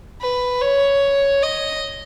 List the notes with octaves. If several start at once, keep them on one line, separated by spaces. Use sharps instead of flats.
B4
C#5
D#5